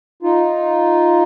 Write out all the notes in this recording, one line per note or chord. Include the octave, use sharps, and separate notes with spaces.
D#4 F4